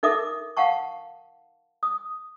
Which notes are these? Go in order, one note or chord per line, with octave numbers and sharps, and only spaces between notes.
D#4 A4 A#4 E5 D6 D#6
F5 F#5 A5 C#6
D#6